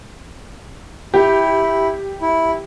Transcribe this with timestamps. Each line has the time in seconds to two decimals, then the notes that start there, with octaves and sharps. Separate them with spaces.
1.14 E4 G4
2.21 E4